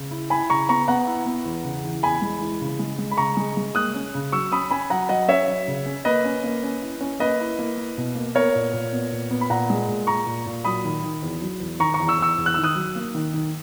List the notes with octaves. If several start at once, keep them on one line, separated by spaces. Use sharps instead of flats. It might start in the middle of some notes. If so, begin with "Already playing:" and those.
Already playing: C#3
E4
E4 G#5 B5
C#3 A#5 C#6
B3 A#5 C#6
B3 F#5 A#5
E4
B3
E2
C#3
E3
E2 G#5 B5
G#3
E3
C#3
G#3
G#3
B5
C#3 A#5 C#6
G#3
G#3
A#3 D#6 F#6
C#4
C#3
F#3 C#6 E6
C#4 B5 D#6
C#4 G#5 B5
F#3 F#5 A#5
F#3 D#5 F#5
C#4 C#5 E5
F#3
C#3
C#4
A#3 B4 D#5
C#4
A#3
C#4
E4
C#4
A#3 B4 D#5
E4
A#3
E4
B2
A#3
B3 A#4 C#5
A#2
A#2
B3
A#2
B3
B5
A#2 F#5 A#5
G#3
A#2
A#2 A#5 C#6
A#2
A#2
F#3 B5 D#6
D#3
D#3
E2
F#3
E2
D#3 A#5 C#6
A#5 C#6
E2
C#6 E6
E2 C#6 E6
E2
F#6
D#3 E6
D#6 F#6
F#3
A#3
D#3
D#3